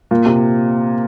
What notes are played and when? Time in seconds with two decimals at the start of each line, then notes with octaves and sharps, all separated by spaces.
0.11 A#2
0.26 C3